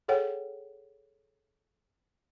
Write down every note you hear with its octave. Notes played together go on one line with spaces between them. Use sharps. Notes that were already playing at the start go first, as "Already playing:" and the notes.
G#4 A4 C#5 F#5 G5